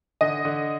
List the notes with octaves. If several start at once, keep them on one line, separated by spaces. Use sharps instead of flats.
D3 D#5
D3